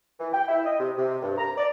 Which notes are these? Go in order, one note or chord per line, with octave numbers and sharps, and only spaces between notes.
E3
G5
E4
D#5
C3
C3
G2
A#5
D5